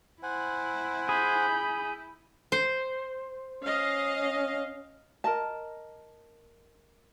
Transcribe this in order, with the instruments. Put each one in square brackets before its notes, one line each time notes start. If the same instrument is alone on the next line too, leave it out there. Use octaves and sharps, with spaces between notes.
[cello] E4 [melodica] C5 F#5 G#5
[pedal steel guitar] G#4 [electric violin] B5 G6
[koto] C5
[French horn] C#4 [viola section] D#5 F5
[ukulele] A#4 D#5 A5